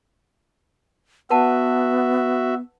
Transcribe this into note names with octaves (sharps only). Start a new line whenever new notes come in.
B3 F#4 B4 E5 F#5 A5